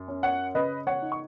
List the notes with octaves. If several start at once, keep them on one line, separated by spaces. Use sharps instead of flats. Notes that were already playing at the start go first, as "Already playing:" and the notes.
Already playing: F#2
C#4
C#5 F#5
C#3 B4 D#5
C#5 F#5
D#4
C#6